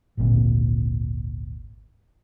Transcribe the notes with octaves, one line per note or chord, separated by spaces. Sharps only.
G#1 D2 A#2 C4